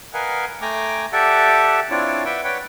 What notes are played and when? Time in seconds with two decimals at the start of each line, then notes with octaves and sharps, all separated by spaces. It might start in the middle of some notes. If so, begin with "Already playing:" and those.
0.14 A#4 B4 D#5 F5 F#5 G#5
0.61 A3 G5 G#5 A#5 D6
1.13 G4 A4 D5 E5 F#5 A5
1.90 C4 D4 E4 F4 C#5 D5
2.25 B4 D5 E5 F#5 G5
2.44 B4 C#5 D5 F#5 G5